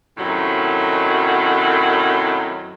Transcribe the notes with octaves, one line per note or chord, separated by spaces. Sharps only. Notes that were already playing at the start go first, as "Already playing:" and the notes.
F#2 A2 C3 D#3 F#3